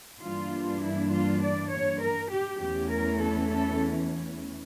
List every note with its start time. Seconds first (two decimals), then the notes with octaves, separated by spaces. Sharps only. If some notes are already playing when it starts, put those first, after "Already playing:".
0.22 G2 E3 G3 A#3 D4 F4
0.82 E4
1.11 F4
1.41 D5
1.70 C#5
2.00 A#4
2.31 G4
2.60 E2 E3 A3 C#4 G4
2.90 A#4
3.19 A4
3.49 A4